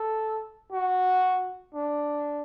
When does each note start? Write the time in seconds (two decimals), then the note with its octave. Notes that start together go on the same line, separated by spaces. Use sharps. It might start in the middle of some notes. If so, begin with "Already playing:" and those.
Already playing: A4
0.72 F#4
1.74 D4